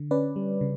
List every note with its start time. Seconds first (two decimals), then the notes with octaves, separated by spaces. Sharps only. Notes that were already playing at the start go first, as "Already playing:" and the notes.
Already playing: D3
0.11 C#4 B4 D5
0.36 G3
0.61 C#3